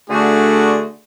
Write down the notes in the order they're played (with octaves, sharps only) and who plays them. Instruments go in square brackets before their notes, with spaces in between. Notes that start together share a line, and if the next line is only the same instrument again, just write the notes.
[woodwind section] D3 A3 [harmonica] D4 F#4 G#4